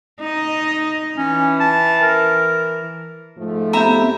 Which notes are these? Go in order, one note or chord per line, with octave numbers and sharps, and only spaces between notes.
D#4 D#5
E3 C#4
A5
A#4
G#2 F3 A3
B3 C4 G4 E5 A#5